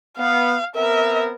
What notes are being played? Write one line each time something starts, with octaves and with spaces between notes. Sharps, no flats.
B3 F5
B3 C4 A#4 E5